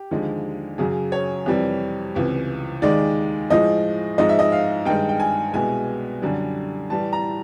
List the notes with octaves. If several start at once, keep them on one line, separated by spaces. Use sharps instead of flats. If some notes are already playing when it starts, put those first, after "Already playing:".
Already playing: G4
D#2 D3 F3 G#3
F#2 C#3 F#3 G#4
C#5
F2 C3 E3 G3
C#2 C3 E3
D#2 D#3 G#3 D5
A2 F3 G#3 D#5
G#2 F3 G#3 D#5
E5
D#5
F5
G2 D#3 G#3 G5
G5
G#5
C2 B2 G#3 G#5
F#2 D3 G3
A2 E3 G3 A5
A#5